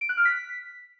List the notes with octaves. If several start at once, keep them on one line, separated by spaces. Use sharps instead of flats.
D7
F#6
F6
B6